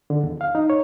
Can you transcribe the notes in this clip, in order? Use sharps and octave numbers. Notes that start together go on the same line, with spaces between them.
D3
E2
F5
D#4
C#5